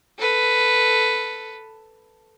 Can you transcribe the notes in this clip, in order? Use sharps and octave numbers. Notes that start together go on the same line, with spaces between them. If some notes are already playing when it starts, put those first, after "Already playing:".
A4 B4